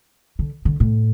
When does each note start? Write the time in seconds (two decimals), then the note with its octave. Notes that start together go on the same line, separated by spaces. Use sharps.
0.39 D3
0.65 D3
0.80 A2